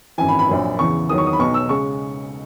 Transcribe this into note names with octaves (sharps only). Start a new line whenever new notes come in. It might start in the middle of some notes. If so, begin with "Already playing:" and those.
G#1 F#2 E3 G#5
B5
B5
A#1 A#2 F#3
E2 C#3 E3 C#6
E2 D#3 F#3 D#6
C#6
D#6
B5
B1 B2 F#3 C#6
E6
C#3 G#3 C#6